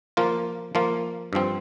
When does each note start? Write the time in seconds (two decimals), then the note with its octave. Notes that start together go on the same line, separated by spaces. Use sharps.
0.17 F3 A#3 F4
0.75 F3 A#3 F4
1.33 G2 F3 C4